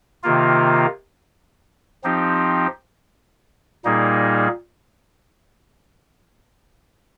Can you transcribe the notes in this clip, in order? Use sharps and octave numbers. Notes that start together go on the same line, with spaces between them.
C3 D#3 A#3 F4
F3 C4 D#4 G4
A#2 G3 A#3 D#4 G#4